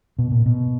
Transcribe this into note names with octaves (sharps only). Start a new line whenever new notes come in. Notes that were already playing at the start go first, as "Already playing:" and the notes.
B2
A#2
B2